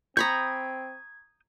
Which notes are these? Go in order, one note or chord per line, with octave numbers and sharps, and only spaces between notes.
C4 A#5 B5 C#6 D#6 G6 G#6